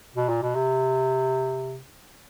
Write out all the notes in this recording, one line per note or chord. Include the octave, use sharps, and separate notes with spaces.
B2
A#2
B2
C3